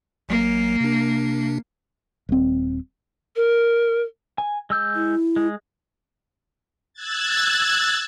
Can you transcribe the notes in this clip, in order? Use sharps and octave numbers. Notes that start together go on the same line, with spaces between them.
A1 F#3 A#3
C3 D4
D#1 C4
A#4
G#5
G#3 E6 G6
E4
G#3
E6 F#6 G#6 A6